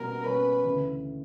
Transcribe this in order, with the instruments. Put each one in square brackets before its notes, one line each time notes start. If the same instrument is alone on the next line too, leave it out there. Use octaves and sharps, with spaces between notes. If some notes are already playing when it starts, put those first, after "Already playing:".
Already playing: [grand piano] B2 G3 A#3 C#4 [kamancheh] A#4
[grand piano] B2 G3 A#3 C#4 [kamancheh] B4
[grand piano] D2 C#3 E3